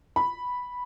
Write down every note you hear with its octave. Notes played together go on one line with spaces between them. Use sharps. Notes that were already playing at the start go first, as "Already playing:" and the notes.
B5